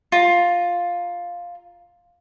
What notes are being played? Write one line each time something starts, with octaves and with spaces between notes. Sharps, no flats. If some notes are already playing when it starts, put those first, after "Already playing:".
F4 A#5